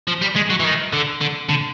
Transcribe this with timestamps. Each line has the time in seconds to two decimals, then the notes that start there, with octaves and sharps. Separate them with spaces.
0.07 F3
0.21 G3
0.36 G#3
0.50 F#3
0.60 E3
0.65 D#3
0.93 D3
1.21 D3
1.49 D3